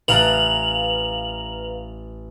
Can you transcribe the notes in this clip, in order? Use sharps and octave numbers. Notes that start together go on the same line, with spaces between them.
A1 B4 F5 A5 A#5 F#6 F7 F#7